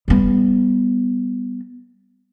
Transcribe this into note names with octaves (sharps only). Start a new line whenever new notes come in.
G3 B3